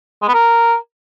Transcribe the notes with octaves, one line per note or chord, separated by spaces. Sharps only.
G#3
B3
A#4